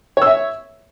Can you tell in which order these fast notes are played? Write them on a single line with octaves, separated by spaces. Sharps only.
C#5 E6 E5